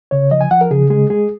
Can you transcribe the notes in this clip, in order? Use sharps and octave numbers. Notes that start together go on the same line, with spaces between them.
C#3 C#5
F3 D#5
G#5
F3 F#5
A#4
C#3 G#4
G#3 G#4
G#3 G#4